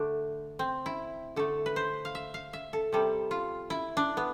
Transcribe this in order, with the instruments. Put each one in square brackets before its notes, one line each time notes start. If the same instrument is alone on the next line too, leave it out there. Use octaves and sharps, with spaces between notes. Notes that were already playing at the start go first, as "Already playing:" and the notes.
Already playing: [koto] D3 A3 D4
C4
E4
D3 A3 A4
B4
C5
F5
E5
F5
E5
A4
C3 G3 A4
F4
E4
D4
B3